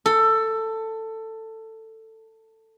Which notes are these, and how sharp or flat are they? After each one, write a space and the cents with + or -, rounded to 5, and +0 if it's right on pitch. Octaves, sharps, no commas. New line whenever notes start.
A4 +15